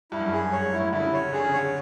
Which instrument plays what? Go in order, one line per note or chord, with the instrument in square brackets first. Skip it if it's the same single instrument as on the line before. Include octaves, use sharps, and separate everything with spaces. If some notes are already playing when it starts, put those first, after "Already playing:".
[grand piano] G2 [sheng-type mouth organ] E4
[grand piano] F#2
[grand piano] G2 [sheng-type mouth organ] G#4
[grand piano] G2 [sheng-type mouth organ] C#5
[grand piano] G#2
[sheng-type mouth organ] E4
[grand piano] A2
[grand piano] D3 [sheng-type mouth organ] E4
[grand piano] C#3
C3
[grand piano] C#3 [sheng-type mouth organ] C#5
[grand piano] D3 [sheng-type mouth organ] G#4
[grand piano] C#3
[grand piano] D3 [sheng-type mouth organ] C#5